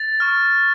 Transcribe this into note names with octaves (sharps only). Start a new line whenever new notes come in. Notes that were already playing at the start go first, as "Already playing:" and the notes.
Already playing: A6
C#6 F6